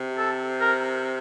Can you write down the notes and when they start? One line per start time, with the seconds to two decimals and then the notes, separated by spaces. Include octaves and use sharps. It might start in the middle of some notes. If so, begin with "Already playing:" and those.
Already playing: C3
0.18 A4
0.61 A#4